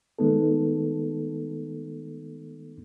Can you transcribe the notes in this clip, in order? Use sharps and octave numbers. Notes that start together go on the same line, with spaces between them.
D#3 G#3 B3 D#4 A4